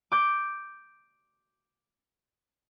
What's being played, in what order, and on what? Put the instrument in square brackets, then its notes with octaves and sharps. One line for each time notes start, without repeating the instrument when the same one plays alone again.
[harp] D6 G6